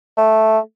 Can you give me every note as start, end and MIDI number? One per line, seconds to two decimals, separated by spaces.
0.17 0.59 57